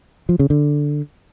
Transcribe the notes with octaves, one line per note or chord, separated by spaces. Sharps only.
F3
C#3
D3